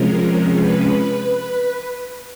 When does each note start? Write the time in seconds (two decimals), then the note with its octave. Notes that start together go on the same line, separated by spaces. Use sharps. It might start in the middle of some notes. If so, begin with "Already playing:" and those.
Already playing: C3 F3 G#3 C#4 A#4
0.56 B4